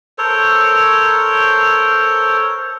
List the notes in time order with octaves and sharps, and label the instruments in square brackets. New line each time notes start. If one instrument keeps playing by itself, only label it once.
[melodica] A4 A#4 C5 C#5